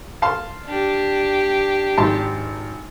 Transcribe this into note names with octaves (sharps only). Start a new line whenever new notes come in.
F5 A5 C6
D4 G4
G#1 A5 C6